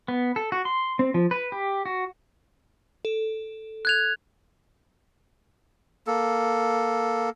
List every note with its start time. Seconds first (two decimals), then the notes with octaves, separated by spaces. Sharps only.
0.08 B3
0.36 A4
0.52 F#4
0.65 C6
0.99 C4
1.14 F3
1.31 B4
1.52 G4
1.85 F#4
3.05 A4
3.85 F#6 G#6 F7
6.07 A#3 A4